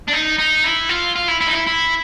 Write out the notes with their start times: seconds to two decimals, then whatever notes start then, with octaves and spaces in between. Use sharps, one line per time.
0.08 D4
0.13 D#4
0.38 D#4
0.64 E4
0.89 F4
1.16 F4
1.28 E4
1.41 E4
1.47 D#4
1.53 E4
1.67 E4